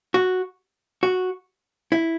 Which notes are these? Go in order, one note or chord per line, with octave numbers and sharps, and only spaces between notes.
F#4
F#4
E4